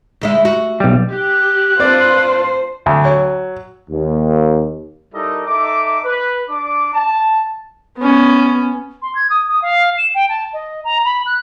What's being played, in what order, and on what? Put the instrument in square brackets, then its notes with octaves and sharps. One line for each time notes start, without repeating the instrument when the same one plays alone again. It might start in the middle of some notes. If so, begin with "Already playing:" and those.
[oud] D2 G#3 E4
F#4
[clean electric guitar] B1 G3
[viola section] G4 [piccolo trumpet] F#6
[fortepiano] C4 D5 [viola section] D4 F4 B4 [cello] C5
[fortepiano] D2
F#3
[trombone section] D#2
[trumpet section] G3 D#4 E4 A4 A#4 D#5
D#4 A4 E5 D6
B4
D4 D6
A5
[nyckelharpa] B3 C#4
[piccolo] C6
G#6
D#6
D#6
F5
E7
G5
A5
D#5
A#5
B5
F#6